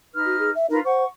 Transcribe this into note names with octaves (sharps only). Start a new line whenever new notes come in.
D#4 B4 F6
F#4
G#4
E5
D#4 F4 A#4 B4
C5 F#5 C#6